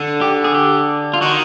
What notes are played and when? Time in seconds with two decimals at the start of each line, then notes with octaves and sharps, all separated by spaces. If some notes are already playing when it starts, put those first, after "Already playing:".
Already playing: D3
0.21 G4
0.44 G#4
0.54 G4
1.14 F4
1.21 D#3 F#4